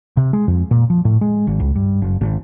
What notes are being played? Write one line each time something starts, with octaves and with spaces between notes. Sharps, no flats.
C3
G#3
F2
A#2
F3
A2
G#3
G#1
C#2
G2
F#1
G#1